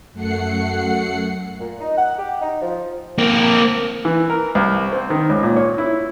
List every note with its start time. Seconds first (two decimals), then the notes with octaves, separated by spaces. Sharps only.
0.13 F#2 A3 F#5 C7 C#7
1.60 A#2
1.80 D#4
1.98 F#5
2.18 G4
2.41 D#4
2.61 F3
3.18 A#3 C4
4.05 E3
4.30 A#4
4.55 C2
4.92 C4
5.10 D#3
5.30 C#2
5.43 A#2
5.56 C#5
5.78 E4